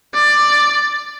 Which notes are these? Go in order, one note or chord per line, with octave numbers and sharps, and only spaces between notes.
D5